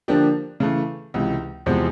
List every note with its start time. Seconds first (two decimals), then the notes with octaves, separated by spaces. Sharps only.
0.08 D3 F3 A#3 D4 G4
0.60 C#3 E3 A3
1.14 C#2 C3 E3
1.66 E2 C3 F3 G#3 C4